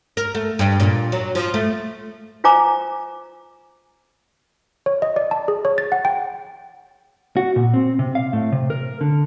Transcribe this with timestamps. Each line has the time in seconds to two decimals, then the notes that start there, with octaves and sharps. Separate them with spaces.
0.17 A#4
0.35 A3
0.59 G2
0.80 A#2
1.12 F#3
1.35 F3
1.54 A3
2.44 F4 C5 G#5 A#5 D6
4.86 C#5
5.02 D#5
5.16 D5
5.31 A5
5.48 G#4
5.65 C#5
5.78 A6
5.92 F#5
6.05 G5
7.37 F#4
7.56 A#2
7.74 C4
7.99 C3
8.15 F5
8.33 A2
8.52 C3
8.70 A#4
9.01 D3